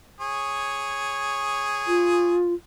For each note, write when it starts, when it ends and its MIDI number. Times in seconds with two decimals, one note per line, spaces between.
0.20 2.36 68
0.20 2.36 73
1.87 2.54 65